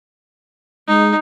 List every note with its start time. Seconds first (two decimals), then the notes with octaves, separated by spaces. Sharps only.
0.88 G#3 D#4